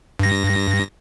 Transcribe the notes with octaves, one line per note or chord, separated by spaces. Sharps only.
G2 A#6